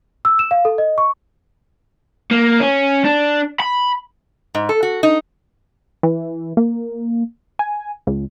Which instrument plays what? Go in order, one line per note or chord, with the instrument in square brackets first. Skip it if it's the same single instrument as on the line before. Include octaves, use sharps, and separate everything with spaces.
[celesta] E6
E7
F5
A4
D#5
C#6
[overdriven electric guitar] A#3
C#4
D4
B5
[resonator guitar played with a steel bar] G#2
A4
F#4
D#4
[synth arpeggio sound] E3
A#3
G#5
C#2